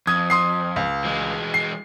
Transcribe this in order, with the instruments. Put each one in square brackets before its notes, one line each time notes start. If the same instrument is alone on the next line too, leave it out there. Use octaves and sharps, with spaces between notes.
[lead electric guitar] F2 [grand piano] D#6 G#6
[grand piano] C6 D#6 C7
C#2
[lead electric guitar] E3 G#3
[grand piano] C7